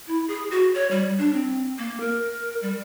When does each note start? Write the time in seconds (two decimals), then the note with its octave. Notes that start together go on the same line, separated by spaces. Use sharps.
0.07 E4
0.28 G#4
0.51 F#4
0.74 C#5
0.91 G3
1.18 D4
1.34 C4
1.78 A#3
2.00 A#4
2.62 G3